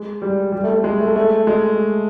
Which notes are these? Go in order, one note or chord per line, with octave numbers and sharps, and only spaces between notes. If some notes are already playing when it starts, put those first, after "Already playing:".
Already playing: G#3
G3
G3
A3
A3
G#3
A3
A3
G#3